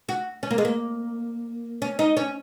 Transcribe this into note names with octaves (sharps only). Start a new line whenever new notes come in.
F#4
C#4
A#3
G#3
A#3
C#4
D#4
C#4